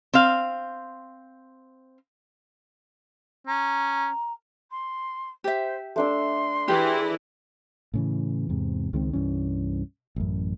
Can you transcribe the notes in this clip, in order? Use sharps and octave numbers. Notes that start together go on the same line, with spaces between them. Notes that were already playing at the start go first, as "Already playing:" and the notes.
C4 F5
C#4 A#5
C6
G4 C5 E5
A3 D4 C6 E6
E3 E4 G4 G#4
A2 C#3 E3
E2 G#2 C3
C#2 D#3 G#3 C4
C2 G2 E3 C#4
A1 F#2